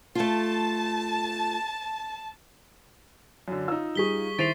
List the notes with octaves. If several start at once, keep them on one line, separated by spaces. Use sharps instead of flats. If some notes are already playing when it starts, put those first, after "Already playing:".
A3 F4 A5
F#2 D3
D#4 F4 E6
G3 G#4 C#6 B6 G7
D#3 E4 C5 A6 C7 D7 D#7 F7